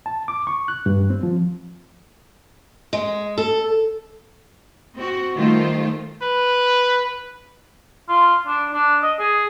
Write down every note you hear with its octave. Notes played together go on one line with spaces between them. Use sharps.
A5
D6
C#6
F#6
G2
C4
F3
G#3
A4
C4 F#4
D#3 G3 A3 F4 C5
B4
F4
D4
D4
D#5
G#4